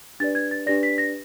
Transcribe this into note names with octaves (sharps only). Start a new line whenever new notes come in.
D4 G4 B4 D5 A6
G#6
A6
D4 G4 B4 D5 A#6
B6
A#6